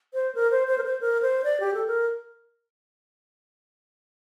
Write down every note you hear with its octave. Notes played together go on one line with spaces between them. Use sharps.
C5
A#4
C5
C5
A#4
C5
A#4
C5
D5
G4
A4
A#4